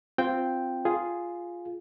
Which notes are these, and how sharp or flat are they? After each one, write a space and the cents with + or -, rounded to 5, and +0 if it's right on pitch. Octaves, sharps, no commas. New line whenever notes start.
C4 +0 F4 +0 G5 +0
F4 +0 G#4 +0